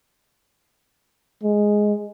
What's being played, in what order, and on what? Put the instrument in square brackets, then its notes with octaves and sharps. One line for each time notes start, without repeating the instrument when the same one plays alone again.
[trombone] G#3